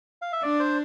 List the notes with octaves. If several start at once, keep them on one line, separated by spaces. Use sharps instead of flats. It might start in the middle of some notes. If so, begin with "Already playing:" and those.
F5
E5
D4 D5
C5